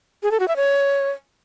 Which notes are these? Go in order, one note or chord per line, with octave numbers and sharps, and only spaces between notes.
G#4
A4
F#4
E5
C#5